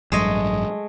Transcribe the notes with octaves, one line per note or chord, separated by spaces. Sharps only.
A1 G2 F#3 G#3 A3 D#5